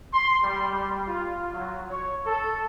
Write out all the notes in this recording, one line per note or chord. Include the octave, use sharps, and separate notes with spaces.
C6
G3
G3
F4
F#3
C#5
A4